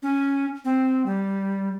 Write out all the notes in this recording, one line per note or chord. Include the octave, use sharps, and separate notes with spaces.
C#4
C4
G3